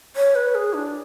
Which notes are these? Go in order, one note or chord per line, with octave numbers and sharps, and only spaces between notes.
C#5
B4
G#4
D4